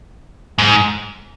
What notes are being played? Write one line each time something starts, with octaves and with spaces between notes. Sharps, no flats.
G#2